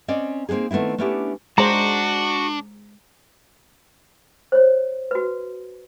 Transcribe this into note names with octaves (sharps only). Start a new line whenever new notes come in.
C4 C#4 D5 D#5
A#3 C4 D4 D#4 G#4
D#3 A3 B3 C4 E4
A3 B3 C#4 D4 E4 G4
G#3 D4 F#4 G#4 C5 A#5
C5 C#5
F#4 B4